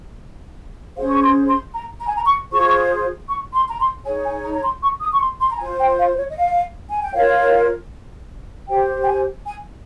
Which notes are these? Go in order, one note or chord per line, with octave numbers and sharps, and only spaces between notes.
C#4 G#4 C5 F5
C#6
C6
C6
A#5
A#5
G#5
A#5
C#6
F4 G#4 C5 C#6
C#6
C6
A#5
C6
D#4 G#4 C#5 G#5
G#5
A#5
A#5
C6
C#6
D#6
C#6
C6
C6
A#5
F4 C5 G#5
G5
F5
C#5
D#5
F5
G#5
G5
F4 A#4 C#5 F5
G4 C5 G5
G5
G#5
G#5